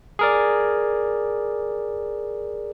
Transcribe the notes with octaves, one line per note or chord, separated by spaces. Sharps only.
G#4 A#4 D5